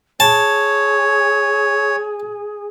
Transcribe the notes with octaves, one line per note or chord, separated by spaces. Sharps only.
G#4 C#5 A5